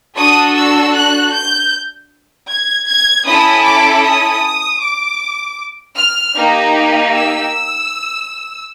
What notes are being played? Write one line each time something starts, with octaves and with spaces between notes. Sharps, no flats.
D4 F#4 A4 D#6
E6
F#6
G6
G#6
G#6
C#4 E4 A4 D#6
D6
D#6
D6
F6
A#3 D#4 G4
E6